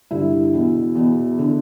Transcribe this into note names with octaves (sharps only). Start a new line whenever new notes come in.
G2 D3 E4
E2 B2
E2 B2
D3